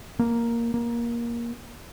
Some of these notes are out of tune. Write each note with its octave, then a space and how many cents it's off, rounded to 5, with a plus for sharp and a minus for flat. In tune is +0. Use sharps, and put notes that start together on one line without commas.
A#3 +0
A#3 +15